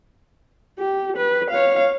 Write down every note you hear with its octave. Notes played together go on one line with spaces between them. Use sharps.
G4
B4
C#5 F5